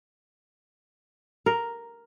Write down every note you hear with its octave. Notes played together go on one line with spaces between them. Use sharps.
A#4